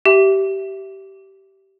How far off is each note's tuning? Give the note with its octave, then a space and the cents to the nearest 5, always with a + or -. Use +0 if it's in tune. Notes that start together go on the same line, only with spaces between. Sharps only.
G4 -20 E5 +0